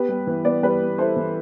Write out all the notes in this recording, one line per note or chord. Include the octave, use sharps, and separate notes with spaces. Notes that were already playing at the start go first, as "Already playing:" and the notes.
Already playing: B3 G4 B4
G3
E3
B3 B4 D5
G3 B4 D5
B3
E4 A4 C5
E3